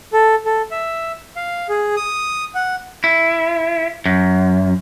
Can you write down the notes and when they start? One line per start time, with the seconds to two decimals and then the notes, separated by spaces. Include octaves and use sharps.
0.13 A4
0.46 A4
0.71 E5
1.36 F5
1.69 G#4
1.97 D#6
2.55 F#5
3.04 E4
4.06 F#2